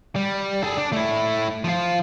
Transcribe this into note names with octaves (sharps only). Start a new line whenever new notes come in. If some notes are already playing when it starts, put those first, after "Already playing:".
G3
G#4 A4
D4
A3 E4
F3 F4